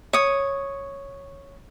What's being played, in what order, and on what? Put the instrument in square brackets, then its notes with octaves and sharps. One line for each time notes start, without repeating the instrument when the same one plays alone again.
[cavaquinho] C#5 D#6